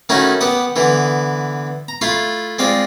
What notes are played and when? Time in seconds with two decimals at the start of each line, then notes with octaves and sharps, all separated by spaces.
0.09 D#3 A3 C#4 D#4 E4 F#4
0.41 B3 G4 F#5 D#6
0.76 D3 E3 B3
1.88 A#5
2.01 A3 E4 F4 F5
2.59 G#3 C4 F4 D5